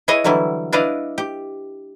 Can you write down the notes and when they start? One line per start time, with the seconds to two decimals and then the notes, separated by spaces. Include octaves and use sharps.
0.08 E4 G#4 B4 C#5 D#5
0.24 D3 E3 F#3 G3 E4
0.73 D4 E4 B4 D5 D#5 F5
1.18 G4